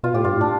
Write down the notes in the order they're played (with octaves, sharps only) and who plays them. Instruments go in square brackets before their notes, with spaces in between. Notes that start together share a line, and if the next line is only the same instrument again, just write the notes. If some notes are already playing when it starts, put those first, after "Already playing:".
[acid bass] B2 [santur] F4
[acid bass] A2 [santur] G4
[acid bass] G2 [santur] F4
[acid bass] A2 [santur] D4